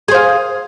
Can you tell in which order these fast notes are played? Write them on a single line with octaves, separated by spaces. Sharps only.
G#4 C5 F5